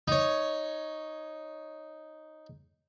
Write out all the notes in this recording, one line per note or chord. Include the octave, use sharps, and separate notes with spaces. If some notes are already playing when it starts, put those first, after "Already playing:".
D#4 C#5